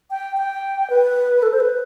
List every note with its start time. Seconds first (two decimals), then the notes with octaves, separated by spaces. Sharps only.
0.10 G5
0.37 G5
0.90 B4
1.42 A4
1.53 C5
1.60 B4